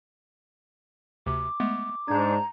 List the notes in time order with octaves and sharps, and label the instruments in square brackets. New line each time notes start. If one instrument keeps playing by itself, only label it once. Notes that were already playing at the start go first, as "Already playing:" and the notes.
[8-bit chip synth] D2 C3 [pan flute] D6
[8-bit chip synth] G#3 A3 B3
[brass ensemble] G#2 D4 [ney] A#5 [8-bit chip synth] G6 G#6